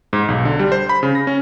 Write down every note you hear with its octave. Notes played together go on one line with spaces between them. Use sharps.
G#2
B1
D3
G3
C5
B5
C#3
A#6
C#4